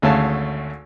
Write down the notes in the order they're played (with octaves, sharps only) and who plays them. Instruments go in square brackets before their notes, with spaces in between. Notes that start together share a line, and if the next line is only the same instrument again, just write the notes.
[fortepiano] G#1 D2 A3 C#4 F5 A5